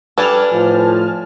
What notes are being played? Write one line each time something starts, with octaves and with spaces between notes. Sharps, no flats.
G3 D4 A4 B4 G#5 A5 F6
A2 F3